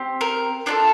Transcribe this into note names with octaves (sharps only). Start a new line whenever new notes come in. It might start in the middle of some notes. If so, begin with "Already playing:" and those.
Already playing: C4 G4
A#4
D4 F4 A4 D5